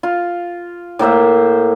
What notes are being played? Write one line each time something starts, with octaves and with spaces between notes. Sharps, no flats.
F4
A2 A#3 C5 E5